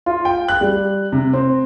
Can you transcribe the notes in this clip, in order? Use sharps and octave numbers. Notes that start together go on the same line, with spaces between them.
F4
G5
F#6
G3
C3
C4